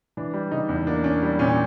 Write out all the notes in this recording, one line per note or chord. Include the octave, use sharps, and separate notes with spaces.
E3 D4
G3
C#3 D#4
E2
A#3 D4
C#4 D4
G3
A#2 C#4